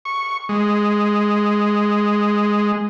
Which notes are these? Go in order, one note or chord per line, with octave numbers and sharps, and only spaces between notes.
C#6
G#3